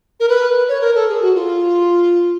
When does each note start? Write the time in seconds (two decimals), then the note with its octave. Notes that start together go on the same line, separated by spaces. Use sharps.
0.20 A#4
0.29 B4
0.69 C#5
0.81 A#4
0.95 A4
1.09 G#4
1.21 F#4
1.35 F4